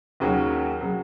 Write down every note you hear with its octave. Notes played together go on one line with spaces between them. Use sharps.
D#2 C#3 F#3 C#4 F#4
C#3 F#3